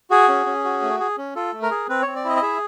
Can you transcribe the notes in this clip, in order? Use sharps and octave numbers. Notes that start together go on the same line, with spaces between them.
F#4 G#4
C#4
C#4
F#4
A3
G#4
C#4
F4 A4
A3
A#4
G#4
C4 B4
C4 C#5
D5
E4 D#5
D#5
G#4 E5